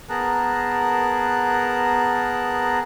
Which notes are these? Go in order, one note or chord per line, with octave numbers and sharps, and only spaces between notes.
B3 G#4 A#4 A5 A#5 F#6